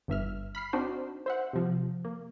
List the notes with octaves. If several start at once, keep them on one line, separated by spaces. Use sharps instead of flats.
G1 G2 E5 F6
B5 F6 C7
C4 D4 D#4 F#4 C5
C5 E5 F#5
C3 F3
A#3